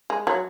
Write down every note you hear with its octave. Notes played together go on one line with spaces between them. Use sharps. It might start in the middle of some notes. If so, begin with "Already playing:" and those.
G#3
F#3